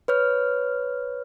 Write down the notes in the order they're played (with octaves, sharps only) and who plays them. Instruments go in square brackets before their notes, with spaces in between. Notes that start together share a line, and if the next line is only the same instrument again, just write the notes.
[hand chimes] B4 C#5 F6